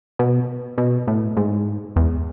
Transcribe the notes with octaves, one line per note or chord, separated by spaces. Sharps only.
B2
B2
A2
G#2
E2